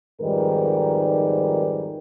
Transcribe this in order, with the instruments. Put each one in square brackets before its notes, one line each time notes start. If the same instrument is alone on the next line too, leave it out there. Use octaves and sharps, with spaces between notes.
[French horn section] F2 G#2 D#3 G3 A#4 B4